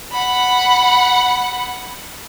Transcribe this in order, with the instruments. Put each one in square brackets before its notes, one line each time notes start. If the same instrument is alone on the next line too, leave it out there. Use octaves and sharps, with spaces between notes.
[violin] F#5 B5